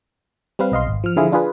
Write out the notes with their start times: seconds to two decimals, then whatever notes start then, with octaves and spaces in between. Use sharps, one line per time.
0.59 G3 C4 B4 F5
0.72 B1 D#5 F5 C6
0.87 G#1
1.04 F3 F6
1.17 D3 F3 E4 F4 G#4
1.32 D4 F4 G#4 B4